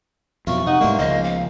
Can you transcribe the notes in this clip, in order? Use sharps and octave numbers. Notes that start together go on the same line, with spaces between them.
F2 B2 F#3 E4 F4 A#4 C#6
C3 D#4 F#5
G#2 G3 A3 A#3 D4 C5
C#2 C#3 F3 C5 D#5
F5